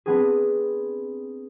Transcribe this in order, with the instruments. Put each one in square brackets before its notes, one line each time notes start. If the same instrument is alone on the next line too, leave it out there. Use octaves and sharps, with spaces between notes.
[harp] B3 C4 D4 G#4